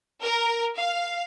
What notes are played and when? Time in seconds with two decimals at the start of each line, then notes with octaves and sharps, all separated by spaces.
0.21 A#4
0.76 F5